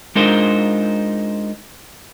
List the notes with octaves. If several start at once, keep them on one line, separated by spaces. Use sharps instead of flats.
G#3 D4 D#4 F4 A#4 C5